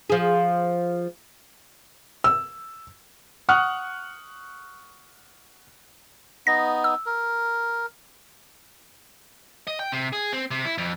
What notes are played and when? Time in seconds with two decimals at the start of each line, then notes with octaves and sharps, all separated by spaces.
0.10 F3 G#4
2.24 E6
3.49 F#5 C#6 D#6 F6 F#6
6.47 B3 D#4 A#6
6.84 E6
7.06 A#4
9.67 D#5
9.79 G5
9.92 C3
10.13 G#4
10.33 C4
10.51 C3
10.65 E4
10.78 F2